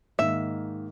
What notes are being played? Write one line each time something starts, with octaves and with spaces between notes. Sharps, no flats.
G#2 D#3 A#3 D#4 E5